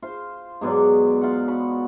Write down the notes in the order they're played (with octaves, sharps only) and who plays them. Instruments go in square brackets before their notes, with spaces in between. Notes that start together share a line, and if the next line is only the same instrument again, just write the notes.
[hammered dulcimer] F4 C5
G#2 B2 F#3 D5
F4 F#5
F#4 B5